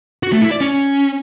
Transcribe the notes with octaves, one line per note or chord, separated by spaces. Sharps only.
F#4
A3
E4
D5
C#4